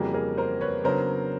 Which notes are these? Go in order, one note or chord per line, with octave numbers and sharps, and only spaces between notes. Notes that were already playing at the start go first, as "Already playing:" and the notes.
Already playing: F2 C#3 E3 G3 A#3 F#4 G#4
G#4 A#4
A#4 C5
B4 C#5
C#3 F#3 B3 D4 A#4 C5